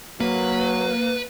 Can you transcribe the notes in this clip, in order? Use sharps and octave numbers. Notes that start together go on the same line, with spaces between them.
F#3 A#3 B4